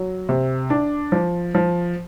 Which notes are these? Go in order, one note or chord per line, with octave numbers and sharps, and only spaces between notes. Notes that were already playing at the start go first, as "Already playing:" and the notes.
Already playing: F#3
C3
D4
F3
F3